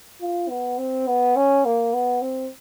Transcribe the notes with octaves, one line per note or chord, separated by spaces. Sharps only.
F4
B3
C4
B3
C#4
A#3
B3
C4